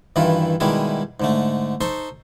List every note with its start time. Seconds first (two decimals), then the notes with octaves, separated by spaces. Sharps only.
0.16 G2 D#3 E3 E4 F4
0.60 B2 D#3 G3 G#3 E4 G#4
1.20 G#2 D3 A3
1.81 D#4 A4 C5 C6 C#6